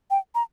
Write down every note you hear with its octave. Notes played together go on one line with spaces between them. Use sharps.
G5
A#5